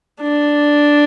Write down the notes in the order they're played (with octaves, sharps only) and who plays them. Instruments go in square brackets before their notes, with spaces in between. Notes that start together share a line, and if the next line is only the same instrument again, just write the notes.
[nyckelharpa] D4